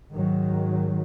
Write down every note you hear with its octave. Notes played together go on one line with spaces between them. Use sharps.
G#2 D#3 F#3